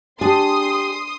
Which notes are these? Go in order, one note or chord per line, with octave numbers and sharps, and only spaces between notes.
D4 G4 G#4 C6 D#6